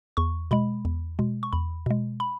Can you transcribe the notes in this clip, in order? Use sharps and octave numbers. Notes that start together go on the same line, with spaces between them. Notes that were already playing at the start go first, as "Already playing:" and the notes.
E2 C#6
B2 G#3 B5
E2
B2 G#3
C#6
E2 B5
B2 G#3
B5